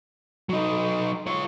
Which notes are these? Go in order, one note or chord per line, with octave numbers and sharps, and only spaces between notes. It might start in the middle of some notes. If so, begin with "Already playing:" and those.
F#3 D#4
F4 C#5